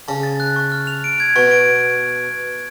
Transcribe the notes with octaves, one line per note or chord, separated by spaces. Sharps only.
C#3 A5
A6
F#6
C#6
F6
F7
D7
G#6
B2 C#6
D7